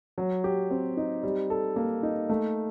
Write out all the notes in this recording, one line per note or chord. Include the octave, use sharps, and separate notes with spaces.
F#3
G4
C4
D#4
G3
A4
A#3
D#4
A3